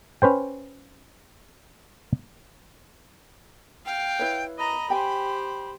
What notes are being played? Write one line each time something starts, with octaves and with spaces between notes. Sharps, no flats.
C#4 B4 C5 G5
F5 G5
E4 B4 C#5
D#5 A#5 B5
G4 C5 G5 G#5